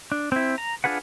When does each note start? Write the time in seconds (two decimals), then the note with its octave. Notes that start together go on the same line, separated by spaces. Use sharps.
0.12 D4
0.32 C4 E4
0.58 A#5
0.84 D4 F4 G#4 B4 F#5